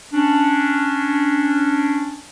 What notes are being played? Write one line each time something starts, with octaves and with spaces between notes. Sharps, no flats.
C#4 D4